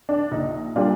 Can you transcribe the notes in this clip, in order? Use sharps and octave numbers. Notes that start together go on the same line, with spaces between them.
D4
A#1 D#4
A#2 G3 D4 F4